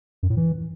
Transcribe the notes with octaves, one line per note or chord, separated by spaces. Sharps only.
F#2
A2
E3